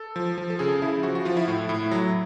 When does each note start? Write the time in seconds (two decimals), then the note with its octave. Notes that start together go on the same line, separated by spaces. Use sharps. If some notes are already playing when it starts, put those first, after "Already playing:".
Already playing: A4
0.16 F3
0.38 F3
0.50 A4
0.59 C#3 G#4
0.82 C#3 E4
1.03 F3 F#4
1.15 F#4
1.25 F3 F4
1.37 E4
1.48 A2
1.69 A2
1.91 F#3